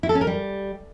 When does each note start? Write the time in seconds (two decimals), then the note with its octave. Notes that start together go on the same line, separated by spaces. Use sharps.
0.03 E4
0.09 A4
0.15 C#4
0.21 A#4
0.27 G3